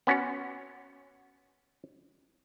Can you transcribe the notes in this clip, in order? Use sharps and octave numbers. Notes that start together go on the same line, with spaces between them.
B3 C#4 F#4 C#5